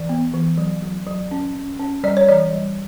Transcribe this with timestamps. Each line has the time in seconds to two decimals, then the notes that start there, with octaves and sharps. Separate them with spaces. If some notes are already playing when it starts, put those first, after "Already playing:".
Already playing: E3 D5
0.09 B3
0.33 E3
0.58 F#3
0.82 F#3
1.07 F#3
1.31 C#4
1.55 C#4
1.79 C#4
2.04 G3 D5
2.17 C#5
2.28 E3 D5
2.53 G3